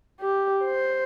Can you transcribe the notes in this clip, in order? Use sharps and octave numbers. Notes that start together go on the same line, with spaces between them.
G4
C5